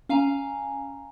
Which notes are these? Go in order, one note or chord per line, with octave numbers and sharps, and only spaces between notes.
C#4 F5 G#5 A#5